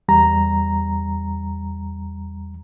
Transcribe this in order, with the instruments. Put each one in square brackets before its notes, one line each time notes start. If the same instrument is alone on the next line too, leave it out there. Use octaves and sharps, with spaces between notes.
[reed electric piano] E2 G3 A#5